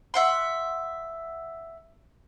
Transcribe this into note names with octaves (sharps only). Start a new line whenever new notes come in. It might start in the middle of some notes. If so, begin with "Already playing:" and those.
E5 F#5 C6